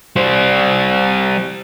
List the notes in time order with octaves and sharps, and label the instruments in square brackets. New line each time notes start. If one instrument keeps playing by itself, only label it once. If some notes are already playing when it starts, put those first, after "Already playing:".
[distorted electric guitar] G3 C5